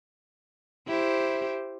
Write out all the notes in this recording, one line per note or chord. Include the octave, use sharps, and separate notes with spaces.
E4 G4 C5